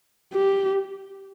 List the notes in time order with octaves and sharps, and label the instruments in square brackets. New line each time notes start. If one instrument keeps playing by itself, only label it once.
[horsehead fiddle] G4